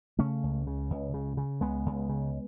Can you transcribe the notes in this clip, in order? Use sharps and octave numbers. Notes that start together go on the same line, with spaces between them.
C#3 A3 C#4
C#2
C#3
C#2
C#3
C#3
C#2 G#3 B3
C#2
C#3